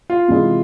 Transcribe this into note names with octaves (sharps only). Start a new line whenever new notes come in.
F4
C3 E3 G#3 C4